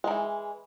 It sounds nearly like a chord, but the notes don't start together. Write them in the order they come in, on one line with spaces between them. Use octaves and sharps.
G#3 D#3 E3